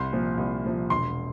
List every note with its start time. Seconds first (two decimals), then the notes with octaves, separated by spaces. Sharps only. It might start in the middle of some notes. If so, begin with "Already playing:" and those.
Already playing: C2 C6
0.12 A#2 F3
0.38 C2
0.65 A#2 F3
0.90 E1 C6